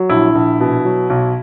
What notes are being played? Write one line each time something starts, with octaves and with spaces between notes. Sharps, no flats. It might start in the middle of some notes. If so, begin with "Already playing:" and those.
Already playing: F#3
A#1 E4
A#1
B2
F#3
B1